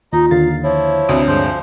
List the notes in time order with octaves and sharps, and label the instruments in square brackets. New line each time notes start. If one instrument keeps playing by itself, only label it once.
[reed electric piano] D#2 [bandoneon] D#4 D#5 [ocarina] F4
[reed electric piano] D#2 D3 A6 [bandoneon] F5
[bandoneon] F3 E4 [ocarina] C#5
[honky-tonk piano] D2 C3 D4 [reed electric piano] D#6
[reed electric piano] G2 G#3 [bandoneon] F3 C5